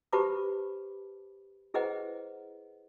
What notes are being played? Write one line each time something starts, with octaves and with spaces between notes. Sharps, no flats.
G4 B4 C5 A5 B5 D6
E4 G#4 B4 C5 D#5 F#5